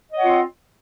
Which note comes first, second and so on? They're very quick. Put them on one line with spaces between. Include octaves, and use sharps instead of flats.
D#5 C#5 F#5 F4 C4